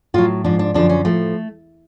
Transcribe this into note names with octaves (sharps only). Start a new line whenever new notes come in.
A2 F#3 F4
G#2 F3 D4
D4
F#2 D3 F3 D4
C#4
A2 F3 A3